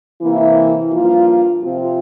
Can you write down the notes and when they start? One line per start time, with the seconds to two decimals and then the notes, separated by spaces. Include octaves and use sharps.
0.22 C3 E3 A#3 E4
0.91 G2 F3 A#3 F4
1.61 C3 F3 C4 F4